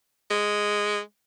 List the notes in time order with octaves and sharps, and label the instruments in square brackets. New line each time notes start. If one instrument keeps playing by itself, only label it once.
[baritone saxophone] G#3